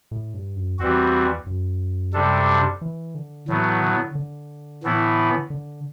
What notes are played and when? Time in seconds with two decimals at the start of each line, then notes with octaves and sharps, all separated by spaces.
0.11 A2
0.34 G2
0.56 F#2
0.79 E2 E3 G3 C4 F#4
1.46 F#2
2.14 C3 G3 D4 A4
2.81 E3
3.15 D3
3.48 A2 E3 F#3 B3
3.82 D3
4.15 D3
4.83 A2 E3 B3 E4
5.50 D3